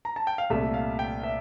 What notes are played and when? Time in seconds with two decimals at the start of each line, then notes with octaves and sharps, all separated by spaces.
0.05 A#5
0.16 A5
0.27 G5
0.38 F5
0.50 C2 A#2 A3 E5
0.74 F5
0.99 G5
1.23 E5